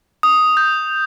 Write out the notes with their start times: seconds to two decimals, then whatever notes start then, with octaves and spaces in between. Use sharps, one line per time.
0.23 D#6
0.57 G6